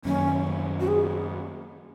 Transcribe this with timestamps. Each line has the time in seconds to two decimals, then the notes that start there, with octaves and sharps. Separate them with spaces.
0.05 F#2 D#3 F#3 A#3 C#4
0.80 F#4
0.88 G#4